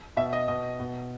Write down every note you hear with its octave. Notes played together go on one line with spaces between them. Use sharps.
B2 E5
D#5
B2 D#5
B2